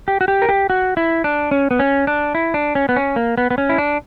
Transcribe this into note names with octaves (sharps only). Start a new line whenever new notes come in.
G4
F#4
G4
A#4
G4
F#4
E4
D4
C#4
B3
C#4
D4
E4
D4
C#4
B3
C#4
A#3
B3
B3
C#4
E4
D4